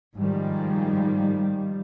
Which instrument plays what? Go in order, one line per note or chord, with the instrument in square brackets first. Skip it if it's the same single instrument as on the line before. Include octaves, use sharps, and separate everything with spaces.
[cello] G#2 [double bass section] D#3 F3 G3